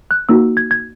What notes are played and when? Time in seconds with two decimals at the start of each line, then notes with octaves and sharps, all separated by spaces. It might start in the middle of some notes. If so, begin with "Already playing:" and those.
0.11 F#6
0.29 A#3 D#4 F#4 E6
0.57 G#6
0.71 G#6